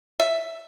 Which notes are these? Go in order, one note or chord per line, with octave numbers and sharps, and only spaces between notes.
E5